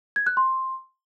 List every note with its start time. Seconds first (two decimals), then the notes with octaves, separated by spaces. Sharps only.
0.16 G#6
0.27 F#6
0.37 C6